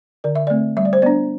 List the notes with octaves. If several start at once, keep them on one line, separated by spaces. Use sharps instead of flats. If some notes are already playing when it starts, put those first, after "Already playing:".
D3 D5
E5
A3 C4 D5
G3 E5
D5
C5
B3 D4 D5